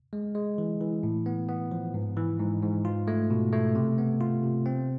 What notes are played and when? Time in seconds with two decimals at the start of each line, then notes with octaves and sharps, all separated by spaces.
0.13 G#3
0.35 G#3
0.58 E3
0.81 E3
1.03 A2
1.26 B3
1.49 B3
1.71 F3
1.94 G#2
2.17 E3
2.39 G#2
2.62 G#2
2.85 F4
3.08 A3
3.30 B2
3.52 A3
3.75 C3
3.98 B3
4.21 F4
4.43 C3
4.66 C4